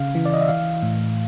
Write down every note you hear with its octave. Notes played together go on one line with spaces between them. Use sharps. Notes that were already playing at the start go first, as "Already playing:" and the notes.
Already playing: C#3 F5
E3
D5
D#5
E5
E3 F5
A2